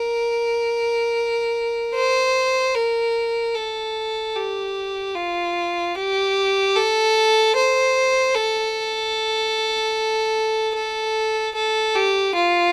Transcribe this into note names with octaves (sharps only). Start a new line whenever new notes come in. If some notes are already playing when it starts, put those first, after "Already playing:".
Already playing: A#4
C5
A#4
A4
G4
F4
G4
A4
C5
A4
A4
A4
G4
F4